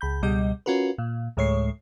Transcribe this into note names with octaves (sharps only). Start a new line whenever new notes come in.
C#2 B5 G6
C#2 B2 G3 D#5 G6
C#4 F4 F#4 A#4 B4
A#2
D2 A2 G#3 C#5 C#6 C7